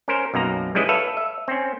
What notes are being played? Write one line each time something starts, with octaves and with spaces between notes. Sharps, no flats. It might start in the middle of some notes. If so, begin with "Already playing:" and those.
C#4 A#4 C5
B1 F#2 A#3 A#5
G3 G#3 C#4 E4 B4 D#5
A4 B4 C#5 E5 F5
E5
C4 C#4